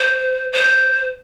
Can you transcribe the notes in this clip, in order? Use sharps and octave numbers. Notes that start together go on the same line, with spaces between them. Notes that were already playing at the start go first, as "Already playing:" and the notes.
Already playing: C5
C5